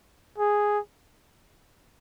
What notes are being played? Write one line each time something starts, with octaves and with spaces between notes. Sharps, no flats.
G#4